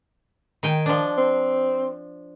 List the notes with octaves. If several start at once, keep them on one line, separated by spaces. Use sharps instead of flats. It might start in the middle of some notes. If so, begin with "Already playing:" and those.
D#3 G5 G#5
F3 D4
C4